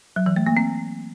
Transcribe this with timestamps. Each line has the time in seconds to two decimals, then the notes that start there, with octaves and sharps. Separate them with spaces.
0.16 F#3
0.26 E3
0.36 A3
0.46 A#3
0.57 C4